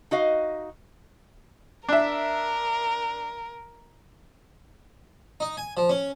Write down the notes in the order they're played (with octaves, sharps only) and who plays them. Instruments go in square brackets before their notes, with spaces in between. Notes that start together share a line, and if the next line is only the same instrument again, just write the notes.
[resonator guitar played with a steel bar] D#4 F#4 D#5 F5
[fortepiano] D4 E5 [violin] A#4
[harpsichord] D#4
G#5
F3
C#4